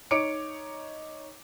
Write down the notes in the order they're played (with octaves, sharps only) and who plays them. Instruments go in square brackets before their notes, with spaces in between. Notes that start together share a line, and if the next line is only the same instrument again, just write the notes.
[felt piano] D#4 C#5 D6 C#7 D7